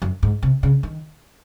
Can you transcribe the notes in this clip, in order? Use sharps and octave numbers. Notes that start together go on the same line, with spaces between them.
F#2
G#2
C3
C#3
D#3